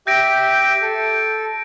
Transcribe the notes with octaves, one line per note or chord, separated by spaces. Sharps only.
G4 E5 G5 G6 A#6 D7
A4